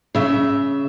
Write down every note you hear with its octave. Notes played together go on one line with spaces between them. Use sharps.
C#3 E5